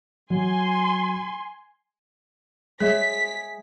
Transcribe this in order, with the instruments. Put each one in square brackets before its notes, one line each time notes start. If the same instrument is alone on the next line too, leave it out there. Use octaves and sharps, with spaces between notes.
[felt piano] F#3 [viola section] G#5 C6
[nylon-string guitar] G#3 E5 [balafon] G#4 C#5 [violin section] B6